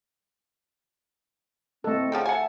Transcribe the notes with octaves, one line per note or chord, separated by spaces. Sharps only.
A3 C4 A4 D#5
D3 F3 G#4 G5
E5 F#5 G#5 A5